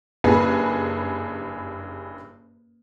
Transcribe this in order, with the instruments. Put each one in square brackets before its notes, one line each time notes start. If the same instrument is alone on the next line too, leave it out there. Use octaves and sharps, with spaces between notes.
[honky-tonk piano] F#1 G2 G#4 [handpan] A#3 B4